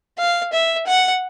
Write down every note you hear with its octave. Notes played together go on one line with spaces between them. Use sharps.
F5
E5
F#5